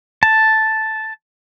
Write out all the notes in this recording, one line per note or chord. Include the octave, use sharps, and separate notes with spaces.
A5